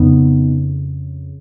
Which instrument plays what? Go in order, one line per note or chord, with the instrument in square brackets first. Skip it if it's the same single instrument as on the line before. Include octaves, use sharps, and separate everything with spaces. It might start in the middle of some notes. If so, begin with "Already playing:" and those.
Already playing: [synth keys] F2 C#3 B3 D#4